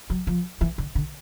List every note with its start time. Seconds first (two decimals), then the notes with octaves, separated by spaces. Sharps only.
0.10 F#3
0.27 F3
0.61 E3
0.78 D3
0.95 D3